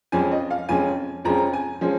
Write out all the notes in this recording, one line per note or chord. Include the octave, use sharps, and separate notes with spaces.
F2 F3 G#3 C#4 G#5
D#5
F5
F2 F3 G#3 C#4 G#5
F2 F3 G#3 C#4 A#5
G#5
F3 G#3 C#4